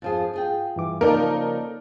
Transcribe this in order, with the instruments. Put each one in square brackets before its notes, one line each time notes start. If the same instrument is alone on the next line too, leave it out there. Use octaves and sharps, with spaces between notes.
[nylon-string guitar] F2 F3 G#4
F4 G#4 G5
[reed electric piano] G2 E3 D6
[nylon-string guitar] C#3 F3 [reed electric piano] A#3 A4 D5 [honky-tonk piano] D#4 A#4